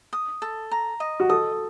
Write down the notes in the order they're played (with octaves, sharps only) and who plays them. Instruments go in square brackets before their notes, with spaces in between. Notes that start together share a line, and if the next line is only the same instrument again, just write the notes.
[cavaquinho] D#6
A4
A#5
D#5
[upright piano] F#4
[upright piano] A4 [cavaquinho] D#6